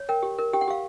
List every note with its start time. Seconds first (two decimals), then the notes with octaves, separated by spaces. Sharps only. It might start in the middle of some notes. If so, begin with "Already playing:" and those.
Already playing: C#5
0.09 A#4 G5
0.23 G4
0.39 A#4
0.53 G4 G5
0.61 F#5
0.68 G4 F5